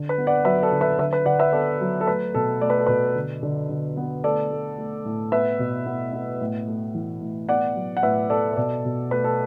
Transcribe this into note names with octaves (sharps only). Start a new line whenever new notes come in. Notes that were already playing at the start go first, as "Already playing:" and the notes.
Already playing: D3
B4
B3
D5 F#5
F#3 B4 E5
A4 D5
D3
B4 E5
D3 B4 E5
B4
D3 D5 F#5
B4 E5
B3 A4 D5
F#3
A4
A3 B4
B2 A4
A3 D5
B4
A4
B2 B4
D3
D3
D3
B3
A3 A4 D5
A3
A3
A2
B3 B4 E5
B2
B3
B3
A2
A3
E3
A2
B3 D5 F#5
F#3
F#5
A2 B4 E5
B3 A4 D5
B4
B2 A4 D5
B2
A3 B4
A4